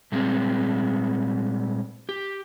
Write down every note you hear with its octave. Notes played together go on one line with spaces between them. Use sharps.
A#2 G3 G#3 C4
G4